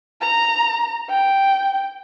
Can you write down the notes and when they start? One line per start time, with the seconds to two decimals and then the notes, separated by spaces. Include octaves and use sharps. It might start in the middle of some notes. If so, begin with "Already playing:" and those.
0.21 A#5
1.09 G5